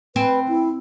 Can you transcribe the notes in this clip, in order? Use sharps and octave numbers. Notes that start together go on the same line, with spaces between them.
C4 B4
E4